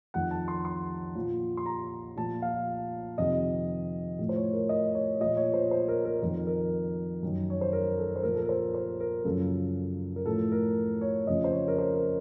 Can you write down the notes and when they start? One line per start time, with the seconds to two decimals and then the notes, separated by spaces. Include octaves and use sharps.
0.14 F2 D#3 F#5
0.31 A5
0.48 C6
0.65 C6
1.15 A#2 F3
1.57 C6
1.66 A#5
2.16 A#2 F3 A5
2.42 F5
3.18 F2 C3 D#3 D#5
4.19 A2 F3
4.29 C5
4.36 C#5
4.53 A#4
4.69 D#5
4.95 C#5
5.20 A#2 F3 D#5
5.37 C#5
5.54 C5
5.71 C5
5.88 A#4
6.05 A#4
6.21 F2 D#3 A#4
6.47 A#4
7.23 F#2 D#3
7.50 C#5
7.61 C5
7.73 A#4
7.98 A4
8.16 C5
8.23 A#2 F3 A#4
8.35 A4
8.42 A#4
8.49 C5
8.75 C5
9.00 A#4
9.24 F#2 C#3 F3 A4
10.16 A#4
10.26 A2 F3 A4
10.52 A#4
11.01 C#5
11.27 F2 C#3 F3 D#5
11.44 C5
11.53 C#5
11.68 A#4
11.78 C5
11.94 A#4